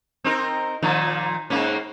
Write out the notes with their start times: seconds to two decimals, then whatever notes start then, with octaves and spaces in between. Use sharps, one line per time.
0.24 C4 D#4 A#4
0.82 A#2 D#3 F3
1.50 G#2 A#3 C#4